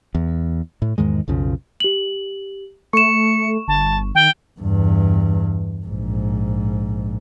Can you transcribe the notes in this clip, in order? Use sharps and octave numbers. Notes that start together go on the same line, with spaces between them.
E2
A2
E2 G#2 D#3 G#3
B1 F2 C#3 F3
G4 F#7
A3 C#6 C#7 E7
G1 A5
D#3 G5
E2 G2
A#1 G#2